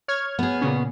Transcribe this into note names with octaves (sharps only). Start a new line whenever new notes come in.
C#5 F6 G#6
B3 G#4
A#2 C#3 C#4